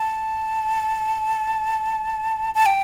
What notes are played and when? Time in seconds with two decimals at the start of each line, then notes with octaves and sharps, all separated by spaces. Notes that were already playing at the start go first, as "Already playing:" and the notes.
Already playing: A5
2.55 A5
2.66 G5